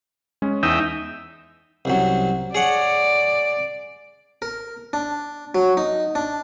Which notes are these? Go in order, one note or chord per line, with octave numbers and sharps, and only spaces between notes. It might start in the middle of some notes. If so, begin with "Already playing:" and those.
G#3 C#4
E2 D#4 E5 G5
C2 F#2 F#3
G#4 C#5 D5 F#5
A#4
D4
F#3
D#4
D4